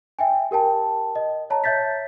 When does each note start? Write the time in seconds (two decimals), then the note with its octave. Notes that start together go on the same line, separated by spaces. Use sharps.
0.19 E5 G5 G#5
0.51 G4 A#4 G5 A5
1.15 D#5
1.50 C#5 A5 A#5
1.64 C#5 E5 G6 A6 B6